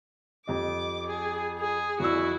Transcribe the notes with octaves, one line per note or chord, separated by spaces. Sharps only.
F2 G4 D#5 D6
G#4
G#4
F2 E4 F#4 D5 E6